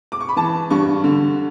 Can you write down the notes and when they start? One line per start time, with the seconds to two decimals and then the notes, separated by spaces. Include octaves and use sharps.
0.12 D6
0.20 C#6
0.29 B5
0.36 E3 A5
0.70 G2 C#6
1.04 D3